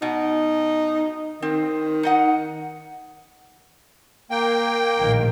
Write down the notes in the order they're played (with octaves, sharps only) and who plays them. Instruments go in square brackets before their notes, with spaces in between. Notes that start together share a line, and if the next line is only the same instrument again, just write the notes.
[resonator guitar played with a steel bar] B2 [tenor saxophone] D#4
[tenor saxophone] D#3 [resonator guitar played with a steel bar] C4
[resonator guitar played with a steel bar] D#4 D#5 F#5
[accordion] A#3 G5
[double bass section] A#1 A2 D#3